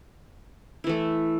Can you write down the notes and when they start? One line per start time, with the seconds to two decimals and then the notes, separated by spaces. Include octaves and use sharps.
0.84 E4
0.87 E3
0.89 A3